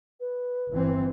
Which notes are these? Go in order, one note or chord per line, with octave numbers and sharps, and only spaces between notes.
B4
G1 E3 C4